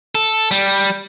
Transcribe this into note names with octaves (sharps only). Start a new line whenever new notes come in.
A4
G3